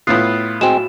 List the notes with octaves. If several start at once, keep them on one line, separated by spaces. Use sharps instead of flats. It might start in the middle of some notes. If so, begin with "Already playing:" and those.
A2 B3 F4 D#6 F#6 C7
G#3 C4 F#4 E7